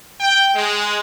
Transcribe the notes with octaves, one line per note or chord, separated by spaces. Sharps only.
G5
G#3